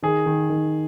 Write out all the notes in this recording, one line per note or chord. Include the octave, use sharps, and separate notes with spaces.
D#3 G#4
D#3
D#3